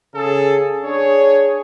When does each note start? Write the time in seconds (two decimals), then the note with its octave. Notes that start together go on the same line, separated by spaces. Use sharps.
0.14 C#3 G#4 A4
0.84 D4 G#4 C#5